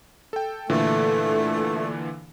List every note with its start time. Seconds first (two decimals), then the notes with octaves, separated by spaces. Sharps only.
0.33 A4 G5
0.70 A#2 D3 E3 A3